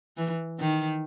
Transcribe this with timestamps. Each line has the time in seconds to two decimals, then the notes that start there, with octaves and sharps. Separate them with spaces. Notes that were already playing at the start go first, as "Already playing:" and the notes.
0.17 E3
0.60 D#3